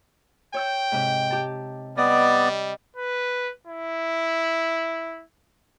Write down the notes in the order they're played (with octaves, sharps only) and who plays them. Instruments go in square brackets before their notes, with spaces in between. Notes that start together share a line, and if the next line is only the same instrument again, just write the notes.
[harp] C#5 E6 G6 [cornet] G5
[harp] G#2 C3
G4 A5
[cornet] G3 [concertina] B3 D5 [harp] D#5
[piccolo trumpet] B4
E4